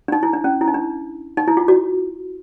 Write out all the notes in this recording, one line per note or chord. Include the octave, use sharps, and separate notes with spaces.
D4
D#4
E4
D4
C#4
E4
D#4
D4
D#4
E4
F4
F#4